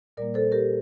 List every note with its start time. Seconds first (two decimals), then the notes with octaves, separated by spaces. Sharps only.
0.17 A#2 G3 A#3 A#4 D5
0.34 A4 C5
0.52 G4 A#4